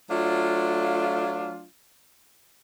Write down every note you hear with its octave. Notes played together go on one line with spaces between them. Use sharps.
F#3 A3 D4 F4